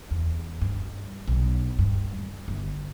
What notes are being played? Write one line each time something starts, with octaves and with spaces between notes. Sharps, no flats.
E2
G2
B1
G2
G3
G1